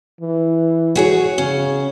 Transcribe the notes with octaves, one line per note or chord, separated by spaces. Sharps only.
E3
F#4 G#4 C#5
C#3 C#4